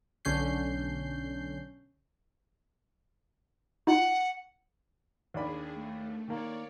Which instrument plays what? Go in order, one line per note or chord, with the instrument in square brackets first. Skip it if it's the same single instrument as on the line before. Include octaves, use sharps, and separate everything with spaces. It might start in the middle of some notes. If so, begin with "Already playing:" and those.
[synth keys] B1 D3 C#4 G6 C7
[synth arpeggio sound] D#4 F4 [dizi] F#5
[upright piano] D#2 D5 B5 [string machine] D4 G#4
[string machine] A3
[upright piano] D#3 A#3 [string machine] C#5 D5